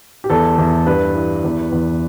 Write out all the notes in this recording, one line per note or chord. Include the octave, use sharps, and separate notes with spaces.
G4
E2 A4
E2
G2 B4
E3
E2
E2